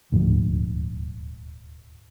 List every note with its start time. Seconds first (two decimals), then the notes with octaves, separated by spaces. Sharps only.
0.12 D#1 D2 G#2 F3